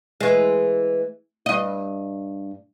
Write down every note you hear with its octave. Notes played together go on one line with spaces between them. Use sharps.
E3 G#3
G2 D#5